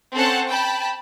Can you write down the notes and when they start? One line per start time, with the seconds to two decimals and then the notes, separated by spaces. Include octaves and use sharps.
0.13 C4 C#4 A4 C5 F#5 A5
0.48 G5 A5 B5